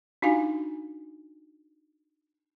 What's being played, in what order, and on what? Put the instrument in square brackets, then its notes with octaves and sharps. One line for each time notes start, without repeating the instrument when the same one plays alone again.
[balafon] D4 D#4 F4 F#4 F5 G#5